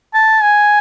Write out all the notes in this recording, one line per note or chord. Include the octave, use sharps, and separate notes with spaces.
A5
G#5